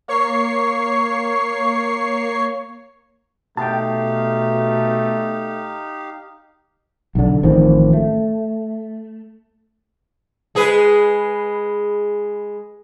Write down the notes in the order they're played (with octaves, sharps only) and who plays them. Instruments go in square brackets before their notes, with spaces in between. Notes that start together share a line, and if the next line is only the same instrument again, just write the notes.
[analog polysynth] A#3 C#5 C#6 C7
[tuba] B2 [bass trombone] A3 [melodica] D#4 G4 F5 [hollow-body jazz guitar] G5 A5
[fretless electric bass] B1 D3
A1 D#3 F3 C4
A3
[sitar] G#3 G#4 B4